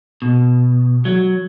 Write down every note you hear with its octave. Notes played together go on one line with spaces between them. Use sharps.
B2
F#3